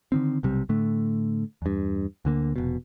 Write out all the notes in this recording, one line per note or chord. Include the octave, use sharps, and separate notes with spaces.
D3 D#3 C4
B1 C3 G3
A2 D3 A3
E2 G2
D2 D3 A#3
F1 B2